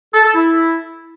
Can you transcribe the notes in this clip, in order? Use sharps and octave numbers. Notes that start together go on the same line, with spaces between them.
A4
A4
E4